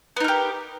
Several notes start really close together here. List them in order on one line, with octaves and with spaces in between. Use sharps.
B3 D#4 A#4 G4